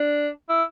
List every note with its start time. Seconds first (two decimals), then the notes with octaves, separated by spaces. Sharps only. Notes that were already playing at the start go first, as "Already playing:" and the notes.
Already playing: D4
0.50 E4